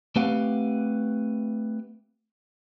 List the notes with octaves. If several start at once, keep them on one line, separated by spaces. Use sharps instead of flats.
A3 C4 G4 B4 F5 F#5